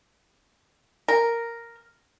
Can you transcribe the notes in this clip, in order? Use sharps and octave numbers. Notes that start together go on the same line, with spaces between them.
A#4